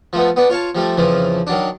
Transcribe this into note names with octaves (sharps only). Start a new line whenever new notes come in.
F3 A3 B3
B3 D4
F4 C#5 F5 A5
F3 G3 A3
F2 C#3 E3 F3
D#3 F#3 D4